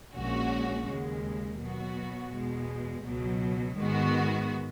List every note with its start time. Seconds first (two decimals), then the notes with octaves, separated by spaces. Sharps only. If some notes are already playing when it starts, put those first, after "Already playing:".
0.14 A#1 A#2 G#3 C#4 F#4
0.87 D#2 C#3 G#3
1.60 B2 F#3 B3 F#4
2.33 E2 B2 G#3
3.06 C#2 B2 F#3
3.79 G#2 D#3 G#3 B3 F#4